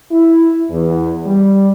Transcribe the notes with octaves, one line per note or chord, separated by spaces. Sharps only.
E4
E2
G3